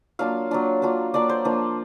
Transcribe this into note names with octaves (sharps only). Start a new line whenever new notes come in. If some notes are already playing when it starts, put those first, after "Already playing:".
F#3 A#3 D4 F4 F5
F#3 A#3 D4 F4
F#3 A#3 D4 F4
F#3 A#3 D4 F4 D5
C5
F3 A#3 D4 F4